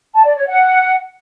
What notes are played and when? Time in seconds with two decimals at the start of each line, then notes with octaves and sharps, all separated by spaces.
0.14 A5
0.25 D5
0.36 C#5
0.47 F#5